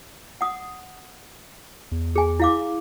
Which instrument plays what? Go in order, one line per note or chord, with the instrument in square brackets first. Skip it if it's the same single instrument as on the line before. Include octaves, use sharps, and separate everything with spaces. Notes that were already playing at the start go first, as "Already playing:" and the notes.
[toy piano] F#5 D#6
[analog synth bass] E2
[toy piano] G#4 G#5
E4 F5 D6